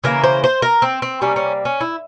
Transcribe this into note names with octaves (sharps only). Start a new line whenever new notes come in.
C#3 E3 A#3 A#4
C5
C5
A#4
C4
C4
C3 G3 A#3 C#4
C#4
C#4
E4